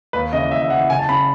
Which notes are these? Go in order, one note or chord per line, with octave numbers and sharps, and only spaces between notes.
D#2 B4
C#3 E3 D#5
D#2 E5
E5
C#3 E3 F#5
F#1 G#5
A5
C#3 B5